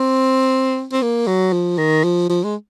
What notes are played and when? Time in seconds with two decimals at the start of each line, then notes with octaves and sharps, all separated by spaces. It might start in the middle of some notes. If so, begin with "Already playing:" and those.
Already playing: C4
0.93 C4
1.02 A#3
1.27 F#3
1.53 F3
1.78 D#3
2.04 F3
2.29 F3
2.44 G#3